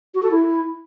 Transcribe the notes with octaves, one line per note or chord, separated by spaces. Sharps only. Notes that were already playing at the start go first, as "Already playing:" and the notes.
F#4
A4
E4